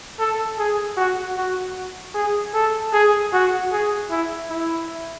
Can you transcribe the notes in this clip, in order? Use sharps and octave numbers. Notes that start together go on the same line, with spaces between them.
A4
G#4
F#4
F#4
G#4
A4
G#4
F#4
G#4
E4
E4